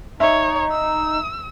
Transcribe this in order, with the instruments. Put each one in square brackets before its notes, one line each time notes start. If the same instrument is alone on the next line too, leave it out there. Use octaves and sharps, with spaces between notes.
[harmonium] D#4 [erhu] C#5 [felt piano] E5
[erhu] E6